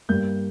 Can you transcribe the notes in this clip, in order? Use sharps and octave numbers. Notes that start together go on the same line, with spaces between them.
G2 G3 A#3 G6